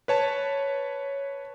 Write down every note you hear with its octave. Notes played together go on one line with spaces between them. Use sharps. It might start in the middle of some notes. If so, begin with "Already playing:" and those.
B4 C#5 A5